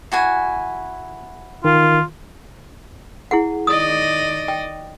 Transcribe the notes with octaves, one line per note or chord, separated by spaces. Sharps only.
E4 F#4 G#5
D#3 F4
E4 G#4 F#5
D#3 D5 D#5 D#6
G5